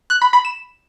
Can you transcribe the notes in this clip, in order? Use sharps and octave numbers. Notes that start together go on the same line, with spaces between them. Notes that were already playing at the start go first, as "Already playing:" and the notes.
F#6
B5
B5
E7